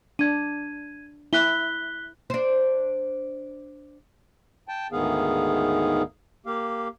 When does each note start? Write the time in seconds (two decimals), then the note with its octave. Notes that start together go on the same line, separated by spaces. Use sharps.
0.19 D4 G#6 D#7
1.33 E4 F#6 B6 G7
2.30 D4 C5
4.68 G5 A5
4.92 D2 G#2 D#3 B3 G#4 F5
6.46 A#3 G4 F5